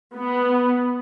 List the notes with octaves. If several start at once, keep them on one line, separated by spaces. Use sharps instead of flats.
B3